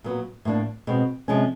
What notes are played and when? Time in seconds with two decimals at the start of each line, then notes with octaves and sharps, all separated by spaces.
0.04 A#2 F#3 B3
0.45 A2 F3 A#3 D4
0.87 B2 G#3 C4
1.28 C3 F3 G#3 C#4